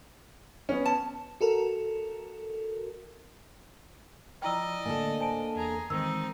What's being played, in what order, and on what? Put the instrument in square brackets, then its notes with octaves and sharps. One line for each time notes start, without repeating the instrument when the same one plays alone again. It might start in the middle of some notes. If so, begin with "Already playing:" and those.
[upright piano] B3 C#4
[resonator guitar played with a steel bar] A5
[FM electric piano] F#4 A4 A#4
[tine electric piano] F3 E4 F6 [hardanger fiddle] D5 D#5 [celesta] G5 A#5 E6
[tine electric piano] A2 D3 A3 [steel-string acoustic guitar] A#3 D4 A4 [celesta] G#5
[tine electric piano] C5 [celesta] G#5 A5 D7
[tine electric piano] E2 [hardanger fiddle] G#4 A#5
[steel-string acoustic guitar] D#3 [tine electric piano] E3 G#3 [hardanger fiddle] C4 D#4 [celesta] E6